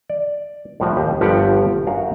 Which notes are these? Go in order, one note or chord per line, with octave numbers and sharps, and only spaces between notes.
D5
C2 A2 F3 F#4
D#2 G4 D#5 G5
G1 G2 F3 F#4 G4 F#5
F#2 F#4 A#4 F5